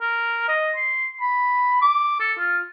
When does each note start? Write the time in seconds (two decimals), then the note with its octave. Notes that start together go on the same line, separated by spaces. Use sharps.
0.01 A#4
0.48 D#5
0.76 C6
1.21 B5
1.82 D6
2.20 A4
2.39 F4